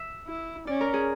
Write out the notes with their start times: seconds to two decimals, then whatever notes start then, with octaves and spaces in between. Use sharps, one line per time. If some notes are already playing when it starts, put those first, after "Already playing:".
Already playing: E5
0.27 E4
0.67 C#4 D5
0.81 A#4
0.94 G#4